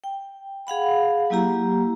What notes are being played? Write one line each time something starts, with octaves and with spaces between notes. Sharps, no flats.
G5
G#4 F5 F#5 B5
F#3 A#3 E4 G4 A#5